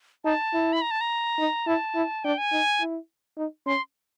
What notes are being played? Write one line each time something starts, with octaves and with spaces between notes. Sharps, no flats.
D#4 A5
E4
B5
A#5
A5
A#5
D#4
E4 A5
E4
D4 G5
G#5
D#4
E4
D#4
C#4 C6